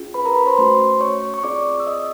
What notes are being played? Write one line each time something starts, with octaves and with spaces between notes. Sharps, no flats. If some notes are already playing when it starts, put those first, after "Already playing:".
Already playing: C#4 F4 G#4
B4 B5
A#4 A#5
B4 B5
C5 C6
A3 C#4 F#4 C5 C6
C#5 C#6
C#6
C4 F4 G#4 D5 D6
E6
D#5 D#6